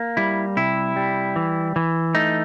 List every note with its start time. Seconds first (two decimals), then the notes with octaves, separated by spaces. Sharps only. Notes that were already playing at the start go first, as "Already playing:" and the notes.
Already playing: A#3
0.17 G3 E4
0.57 C3 E4
0.96 G3
1.36 E3
1.76 E3
2.15 A3 D#4